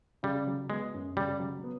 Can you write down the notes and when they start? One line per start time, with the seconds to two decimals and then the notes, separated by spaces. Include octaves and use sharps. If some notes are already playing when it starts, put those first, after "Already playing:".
0.23 C#3 G3
0.47 F#3
0.70 G#3 B3
0.94 F#2
1.17 C#3 G3
1.40 F#3
1.64 B3